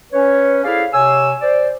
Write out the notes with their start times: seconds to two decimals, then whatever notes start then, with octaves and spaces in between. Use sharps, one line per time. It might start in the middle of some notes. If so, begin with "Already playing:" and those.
0.12 C#4 B4 C#5
0.65 E4 G#4 A4 C5 D5 F5
0.93 C3 C#5 G#5 E6
1.41 C5 D5